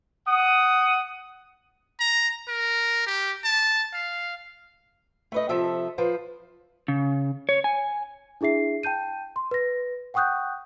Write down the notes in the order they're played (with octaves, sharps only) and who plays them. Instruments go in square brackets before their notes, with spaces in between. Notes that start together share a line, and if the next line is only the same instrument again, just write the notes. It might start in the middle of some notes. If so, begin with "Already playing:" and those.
[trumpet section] F#5 D#6
[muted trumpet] A#5
A#4
G4
A5
F5
[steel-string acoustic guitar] A3 B4 D#5
C3 F3 A4 E5
F3 B4 C5
[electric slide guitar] C#3
C#5
G#5
[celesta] D4 E4 G#4 E5 C7
G5 A5 G6 D#7
C6
B4 A#6
F#5 G5 C#6 D#6 F#6 G6